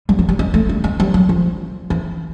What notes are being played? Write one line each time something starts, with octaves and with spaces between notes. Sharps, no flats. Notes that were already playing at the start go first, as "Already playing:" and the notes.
G3
F#3
G3
G#3
A3
G3
G#3
G3
F#3
F3
E3